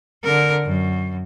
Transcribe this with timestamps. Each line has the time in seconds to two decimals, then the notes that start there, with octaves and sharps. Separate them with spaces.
0.24 D3 A#4
0.64 F#2